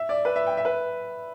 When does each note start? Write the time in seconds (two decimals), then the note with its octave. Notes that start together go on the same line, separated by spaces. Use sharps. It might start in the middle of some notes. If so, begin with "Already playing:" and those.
Already playing: E5
0.09 D5
0.25 B4
0.36 E5
0.46 G5
0.57 E5
0.65 B4